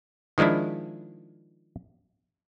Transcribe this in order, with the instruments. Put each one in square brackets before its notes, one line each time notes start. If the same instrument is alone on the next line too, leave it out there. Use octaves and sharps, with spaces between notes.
[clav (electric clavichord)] D#3 F3 G#3 D4 E4